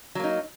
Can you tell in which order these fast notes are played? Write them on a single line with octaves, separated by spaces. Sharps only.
F#3 A#3 D#4